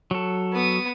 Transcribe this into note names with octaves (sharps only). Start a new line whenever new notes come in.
F#3 A4
B3 D#6